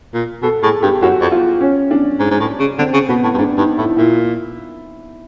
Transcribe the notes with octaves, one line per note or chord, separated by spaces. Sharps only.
A#2
B2 A4
A2 G#4
G2 G4
F#2 F#4
F2
F4
C#4
D4
G#2
G#2
A2
C#3
D3 C4
C#3
B2 B3
A2
G2
G#2 D4
G2 D#4
A2 E4
A#2 E4